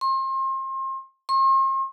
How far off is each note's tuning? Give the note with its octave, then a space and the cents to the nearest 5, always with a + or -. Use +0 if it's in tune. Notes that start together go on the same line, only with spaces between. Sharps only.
C6 +35
C6 +45